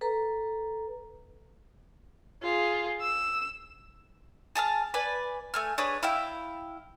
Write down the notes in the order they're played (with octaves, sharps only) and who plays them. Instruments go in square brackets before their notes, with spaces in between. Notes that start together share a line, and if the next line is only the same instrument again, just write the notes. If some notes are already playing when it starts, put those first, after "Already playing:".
[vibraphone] A4 B4 A#5
[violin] F4 G#4
E6
[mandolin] G#4 A5 A#5 F6
B4 D5 G#5
A3 G#5 F6
D4 G#4 B4 C#5
E4 F5 G5